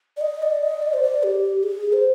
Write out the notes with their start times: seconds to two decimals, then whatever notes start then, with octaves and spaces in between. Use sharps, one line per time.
0.17 D5
0.21 D#5
0.42 D5
0.63 D#5
0.82 D5
0.93 C5
1.03 D5
1.23 G4
1.63 G#4
1.93 C5